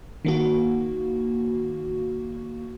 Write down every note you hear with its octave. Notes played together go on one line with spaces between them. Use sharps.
D#3 A#3 F#4